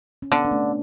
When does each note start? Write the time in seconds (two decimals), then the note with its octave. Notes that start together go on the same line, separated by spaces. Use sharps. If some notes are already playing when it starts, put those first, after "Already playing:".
0.22 C#4
0.32 D3 B3 D4
0.45 D4
0.51 A3 C#4